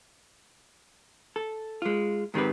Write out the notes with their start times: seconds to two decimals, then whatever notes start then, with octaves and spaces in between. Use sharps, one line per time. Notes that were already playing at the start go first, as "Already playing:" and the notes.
1.36 A4
1.82 G#3 F4
2.34 G#2 D#3 C4 G4 B4